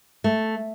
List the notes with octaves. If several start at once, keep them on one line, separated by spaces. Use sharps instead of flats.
A3